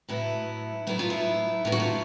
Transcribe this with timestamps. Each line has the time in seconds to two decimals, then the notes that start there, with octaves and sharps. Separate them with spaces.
0.09 A2 F#3 B3 E4
0.87 A2 F#3 B3 E4
0.99 F4
1.10 E4
1.65 A2 F#3 B3 F4
1.72 F#4
1.80 F4